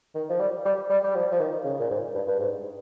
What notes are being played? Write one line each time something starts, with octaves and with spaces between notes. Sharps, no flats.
D#3
F3
G3
G3
G3
G3
F3
F3
D#3
C#3
A#2
G#2
G2
G2
G#2